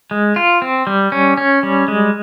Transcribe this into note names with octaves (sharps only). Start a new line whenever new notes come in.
G#3
F4
C4
G3
C#4
C#4
G3
G#3